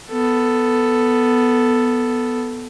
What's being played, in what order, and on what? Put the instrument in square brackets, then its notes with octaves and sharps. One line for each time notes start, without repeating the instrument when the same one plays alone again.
[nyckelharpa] B3 A4